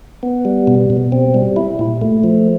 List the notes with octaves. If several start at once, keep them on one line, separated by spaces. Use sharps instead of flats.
B3
G3
B2
B2
C4
G3
E4
A#2
A3
F3